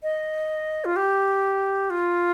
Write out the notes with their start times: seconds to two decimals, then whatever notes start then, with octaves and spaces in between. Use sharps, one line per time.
0.03 D#5
0.85 F4
0.96 G4
1.90 F4